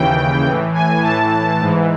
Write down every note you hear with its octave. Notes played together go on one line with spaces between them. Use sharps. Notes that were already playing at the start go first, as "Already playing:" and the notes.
Already playing: D#2 C#3 E3 G5
A2 E3
G#5
A2 E3 A5
G#2 E3